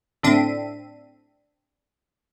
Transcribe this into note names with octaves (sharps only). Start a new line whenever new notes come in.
A2 D3 C4 D4 E5 D#7